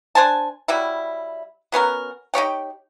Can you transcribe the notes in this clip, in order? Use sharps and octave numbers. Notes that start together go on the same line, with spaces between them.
D4 C5 G#5 A5
F#3 G3 E4
F#3 B3 C#4 A#4
D#4 G4 C#5 G5